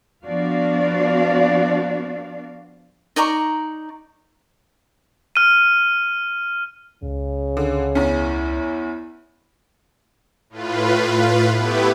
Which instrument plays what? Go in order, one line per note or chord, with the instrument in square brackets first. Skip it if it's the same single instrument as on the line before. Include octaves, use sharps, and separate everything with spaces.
[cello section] F3 B3 D4 F#4 D5 F5
[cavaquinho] D#4 D5 A#5 C#6
[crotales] F6 D#7
[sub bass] C#2 [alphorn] C#3
[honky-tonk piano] D3
[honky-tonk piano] E2 C#4 [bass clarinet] E4
[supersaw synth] A2 F4 B4
A3 B3 E4 G4 B4